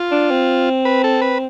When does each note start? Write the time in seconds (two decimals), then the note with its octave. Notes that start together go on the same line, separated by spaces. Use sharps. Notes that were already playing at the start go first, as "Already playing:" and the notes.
Already playing: F4
0.11 D4
0.31 C4
0.85 B4
1.04 A4
1.22 B4